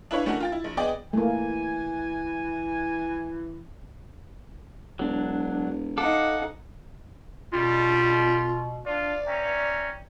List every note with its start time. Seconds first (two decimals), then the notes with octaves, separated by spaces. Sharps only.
0.11 D4 E4 B4 C#5 F5
0.25 E3 A3 C#4 D4 F#4 A#4
0.40 F4 G5 A6
0.52 E4
0.64 A#1
0.77 B3 G#4 D5 D#5 G5
1.13 E3 A3 A#3 G#5
4.99 E1 F#3 D4
5.98 D#4 A4 F5 F#5 D6
7.53 B2 G3 F4
8.86 D4 F4 D5
9.27 C#4 E5 G5 A#5